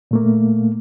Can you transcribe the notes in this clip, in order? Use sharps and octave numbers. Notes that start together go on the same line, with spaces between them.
A#2 A3 A#3